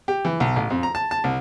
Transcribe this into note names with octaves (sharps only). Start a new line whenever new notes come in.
G4
E3
B1
A1
F2
A#5
A5
A5
C2